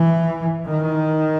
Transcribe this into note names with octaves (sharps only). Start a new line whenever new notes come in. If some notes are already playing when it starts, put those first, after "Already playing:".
Already playing: E3
D#3